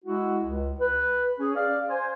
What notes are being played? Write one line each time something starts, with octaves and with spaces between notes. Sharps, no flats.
G#3 E4 F#4
C#2
B4
C#4 G#4
D5 F5
C5 G#5